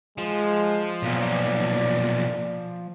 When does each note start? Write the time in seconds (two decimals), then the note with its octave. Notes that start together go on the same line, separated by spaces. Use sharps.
0.18 F3 G#3
1.03 B1 A#2 D5